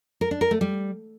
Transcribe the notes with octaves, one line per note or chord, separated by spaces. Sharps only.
A#4
D4
A#4
A3
G3